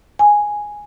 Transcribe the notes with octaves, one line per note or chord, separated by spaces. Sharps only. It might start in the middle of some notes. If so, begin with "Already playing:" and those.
G#5